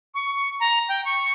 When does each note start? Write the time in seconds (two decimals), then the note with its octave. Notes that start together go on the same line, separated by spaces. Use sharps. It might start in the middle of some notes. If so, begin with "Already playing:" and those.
0.15 C#6
0.60 A#5
0.89 G5
1.05 C#6